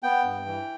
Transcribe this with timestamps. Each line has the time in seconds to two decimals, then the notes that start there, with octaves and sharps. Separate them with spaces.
0.03 B3 G5
0.24 G2
0.46 E3